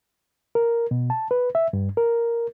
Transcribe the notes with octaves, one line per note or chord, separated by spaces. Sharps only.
A#4
B2
A5
B4
E5
G2
A#4